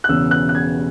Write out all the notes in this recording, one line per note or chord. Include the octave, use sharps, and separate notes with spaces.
F#6
E1 E2 C#3 E6
F#6
F#6
G#6